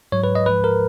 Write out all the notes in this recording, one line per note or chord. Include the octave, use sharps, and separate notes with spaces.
G#2 F#3 C#5
B4
D#5
G#2 F3 G#3 B4
A#4